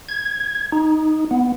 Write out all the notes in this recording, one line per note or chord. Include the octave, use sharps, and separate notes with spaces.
G#6
D#4
B3